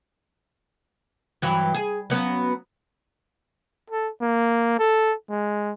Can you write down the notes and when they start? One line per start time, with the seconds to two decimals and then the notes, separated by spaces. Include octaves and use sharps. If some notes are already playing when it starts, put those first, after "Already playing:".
1.42 G2 E3 F#3
1.74 G#4
2.10 F#3 B3 C#4
3.90 A4
4.21 A#3
4.79 A4
5.30 G#3